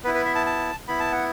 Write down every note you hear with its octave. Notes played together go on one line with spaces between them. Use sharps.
B3 E4 B4
B4
E5
A5
A5
B3 E4 B5
A5
F#5